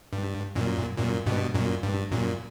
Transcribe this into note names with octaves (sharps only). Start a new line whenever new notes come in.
G2
F#2 A#2
F#2 A#2
G2 B2
F#2 A#2
G2
F#2 A#2